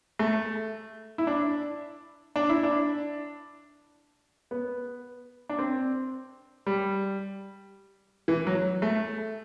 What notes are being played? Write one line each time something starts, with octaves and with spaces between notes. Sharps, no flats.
A3
E4
D4
D4
E4
D4
B3
D4
C4
G3
E3
F#3
A3